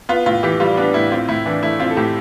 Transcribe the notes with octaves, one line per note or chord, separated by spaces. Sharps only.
B3 F4
A2 F4
E3 G4
G3 F4
B3 D4
A2 E4
C4 F4
A2 E4
E3 D4
A3 E4
C4 F4
A4
A2 G4